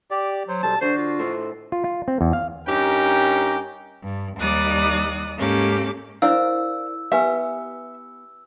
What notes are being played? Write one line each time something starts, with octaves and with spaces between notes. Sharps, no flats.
G4 D5
F#3 C5
B1 G3 A4 A5
D3 D4 F#4 C5
F4
A2 A4 C5
F4
F4
C4
E2
F5
G2 C#4 D#4 G4 A#4 G5
G2
D#2 G3 D#4 D5 D#6 F#6
G#2 A#3 C#4 G4 A4 D6
D4 E4 A#4 C5 F5 E6
B3 G4 B4 E5 G#5